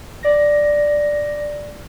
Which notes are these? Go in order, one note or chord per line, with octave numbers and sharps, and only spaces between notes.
D5 A#6